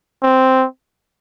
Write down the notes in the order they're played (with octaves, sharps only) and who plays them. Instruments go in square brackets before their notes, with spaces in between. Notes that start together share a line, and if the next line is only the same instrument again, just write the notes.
[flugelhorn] C4